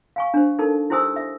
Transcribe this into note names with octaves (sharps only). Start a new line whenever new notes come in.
F5 G#5 C#6
D4 C5
D#4 A4 A#4 A5
E4 G4 C5 G#5 D#6 E6
E5